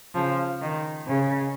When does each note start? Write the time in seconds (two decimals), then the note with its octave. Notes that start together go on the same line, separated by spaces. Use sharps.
0.14 C#3 F3
0.62 D#3
1.08 C#3